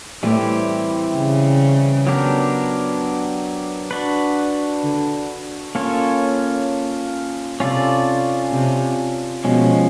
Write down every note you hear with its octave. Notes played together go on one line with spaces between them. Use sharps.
A2 E3 G3 C4 E4 G4
C#3
F#3 B3 D4 G4 A#4
D4 F#4 B4
D3
A#3 C#4 F4 A4 C#5
C3 C#4 F4 A4 D5
C3
B2 F3 G#3 C#4